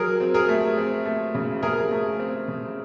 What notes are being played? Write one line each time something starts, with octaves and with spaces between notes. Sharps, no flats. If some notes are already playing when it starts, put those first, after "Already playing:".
Already playing: F#3 G#4 A#4
C4
G#4 A#4
A3
C4
A3
C#3
C#3 G#4 A#4
A3
C4
C#3